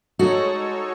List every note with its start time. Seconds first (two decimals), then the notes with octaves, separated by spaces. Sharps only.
0.19 G#3 D#4 F#4 A4 C#5